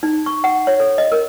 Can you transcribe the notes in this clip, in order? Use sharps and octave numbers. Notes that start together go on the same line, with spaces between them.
D#4
C#6
F#5
C#5
A4
D#5
A#4